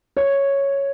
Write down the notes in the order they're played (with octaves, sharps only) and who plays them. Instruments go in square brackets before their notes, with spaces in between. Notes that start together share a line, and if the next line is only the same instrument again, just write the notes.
[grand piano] C#5